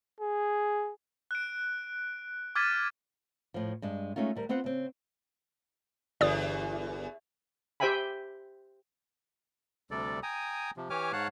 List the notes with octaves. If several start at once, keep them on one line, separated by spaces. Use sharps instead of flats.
G#4
F#6 D7
D6 F6 G#6 A6 B6 D#7
A2 F3
G2 G#3 D4
G#3 A3 C#4 D#4 F4
D2 G3 A#4
B3 C4 F4 C5 F#5
C#3 C4
G1 E2 D5 D#6
G4 C5 E5 G5 G#5 B5
D2 C3 G3 A4 D5
G5 G#5 A#5 D#6
C3 F3
E3 G4 C#5 G#5 D6 F6
G#2 C#5 F5 F#5 A5 F#6